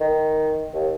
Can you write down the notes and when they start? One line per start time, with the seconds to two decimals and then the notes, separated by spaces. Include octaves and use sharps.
0.01 D#3
0.74 D#2